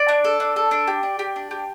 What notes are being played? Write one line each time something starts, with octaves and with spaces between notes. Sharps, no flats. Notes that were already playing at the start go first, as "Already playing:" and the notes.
Already playing: D5
D4
A4
D4
A4
D4
G4
D4
G4
D4
G4